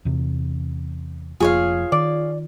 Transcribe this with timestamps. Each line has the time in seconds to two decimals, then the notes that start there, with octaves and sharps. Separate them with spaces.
0.05 E2 C3
1.40 F1 F3 A#3 F4 G#4 C#5 F5
1.92 D#3 D5